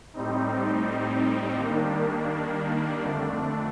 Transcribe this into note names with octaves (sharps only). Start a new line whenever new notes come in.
A2 G3 C4 D#4
D#3 G3 A#3 D4
F2 D3 A3 D4